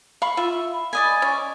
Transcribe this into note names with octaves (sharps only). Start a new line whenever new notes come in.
F5 B5 C#6
F4 E5
B5
D5 D#5 G#5
C#4 C#6